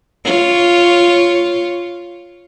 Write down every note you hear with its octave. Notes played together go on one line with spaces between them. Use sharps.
F4 C#5